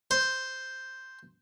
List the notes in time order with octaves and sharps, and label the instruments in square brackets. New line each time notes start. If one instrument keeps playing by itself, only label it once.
[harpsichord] C5